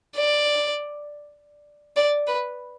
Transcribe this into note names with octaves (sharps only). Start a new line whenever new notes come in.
D5
D5
B4